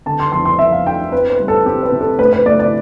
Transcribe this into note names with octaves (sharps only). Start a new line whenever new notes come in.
D3 A5
C6
F2 C6
C6
F2 E5
F5
D4 G5
C4 B4
B4
G3
A4
C4 G4
B4
C3
A4
A3 B4
B4
A3 D5
D5